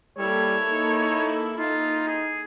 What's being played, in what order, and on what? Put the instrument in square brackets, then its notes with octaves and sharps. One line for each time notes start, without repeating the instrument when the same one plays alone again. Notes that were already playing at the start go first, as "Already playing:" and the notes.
[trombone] G3 [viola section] A#3 E4 A4 [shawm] C#5
[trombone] D#4
[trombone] D#4 [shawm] F4
[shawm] G#4